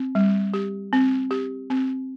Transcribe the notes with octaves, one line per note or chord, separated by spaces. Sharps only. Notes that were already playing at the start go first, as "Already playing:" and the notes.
Already playing: C4
G3
G4
C4
G4
C4